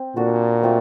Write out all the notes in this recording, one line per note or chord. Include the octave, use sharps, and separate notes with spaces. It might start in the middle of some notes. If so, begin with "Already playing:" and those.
Already playing: C4
A#2 D4 F#4 A4
F#3 A3 C4 F4